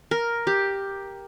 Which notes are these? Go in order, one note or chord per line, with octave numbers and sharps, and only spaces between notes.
A#4
G4